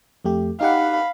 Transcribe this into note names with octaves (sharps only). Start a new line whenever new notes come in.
F2 A3 G4
D#4 G4 F5 F#5 B5